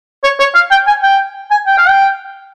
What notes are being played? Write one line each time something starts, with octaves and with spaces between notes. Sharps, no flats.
C#5
C#5
F5
G5
G#5
G5
G#5
G5
F5
G5